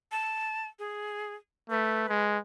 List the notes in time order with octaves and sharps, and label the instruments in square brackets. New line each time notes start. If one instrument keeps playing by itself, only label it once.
[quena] A5
G#4
[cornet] A3 [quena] B4
[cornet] G#3